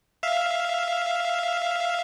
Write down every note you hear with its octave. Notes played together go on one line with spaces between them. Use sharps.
E5 F5